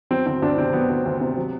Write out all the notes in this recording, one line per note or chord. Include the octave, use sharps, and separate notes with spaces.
F#3 C4
D2 C4
D2 D4
C3 C4
F#3 B3
D2
D2
C3
F#3